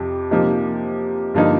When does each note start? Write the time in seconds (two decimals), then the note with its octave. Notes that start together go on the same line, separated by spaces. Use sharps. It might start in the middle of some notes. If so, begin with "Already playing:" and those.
Already playing: F2 C3
0.31 C3 F3 A#3 D#4
1.34 G2 D3 F3 A#3 D#4